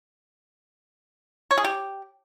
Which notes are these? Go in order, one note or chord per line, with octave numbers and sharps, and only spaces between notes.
C#5
G#4
G4